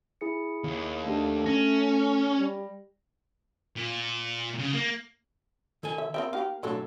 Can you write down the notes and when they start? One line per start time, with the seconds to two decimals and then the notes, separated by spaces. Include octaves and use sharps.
0.21 E4 G#4 C#7
0.64 D#2
1.06 A3 A#3 D4 G4
1.46 C#4 A#6
2.39 G3
3.76 A#2
4.59 C#3
4.75 A#3
5.83 D#3 A4 G#5
5.98 E5
6.14 C4 A#4 E5 G5
6.33 A#3 D#4 G4 F5
6.63 B1 A2 F#3 D4 A4